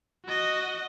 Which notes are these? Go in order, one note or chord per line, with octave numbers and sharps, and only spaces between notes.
F#4 D#5